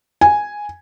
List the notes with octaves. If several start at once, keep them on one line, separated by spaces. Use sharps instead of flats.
G#5